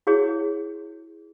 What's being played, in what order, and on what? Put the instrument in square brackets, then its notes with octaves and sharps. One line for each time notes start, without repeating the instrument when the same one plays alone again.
[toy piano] E4 F#4 G#4 C#5